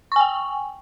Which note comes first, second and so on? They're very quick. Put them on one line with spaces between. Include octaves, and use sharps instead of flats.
C#6 G#5 G5